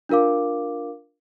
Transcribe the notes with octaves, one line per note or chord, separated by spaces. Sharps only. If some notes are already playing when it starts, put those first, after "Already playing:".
D4 F4 A#4 F5 D6